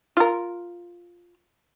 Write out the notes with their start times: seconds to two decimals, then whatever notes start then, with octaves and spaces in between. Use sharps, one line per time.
0.17 F4 A#4